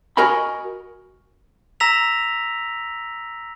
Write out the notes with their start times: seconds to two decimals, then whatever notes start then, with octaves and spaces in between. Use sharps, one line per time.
0.17 F#4 A#4 D#5 G#5 B5
1.80 A#5 E6 A#6 B6 F7